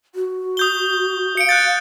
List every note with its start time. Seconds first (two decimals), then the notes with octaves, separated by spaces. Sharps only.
0.15 F#4
0.57 D#6 G6 G7
1.37 F5 C#7 D7
1.49 F#6 G6 A6